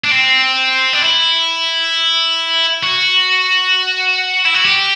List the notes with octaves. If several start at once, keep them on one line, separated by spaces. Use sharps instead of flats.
D4
C4
D4
E4
F#4
E4
F#4
G4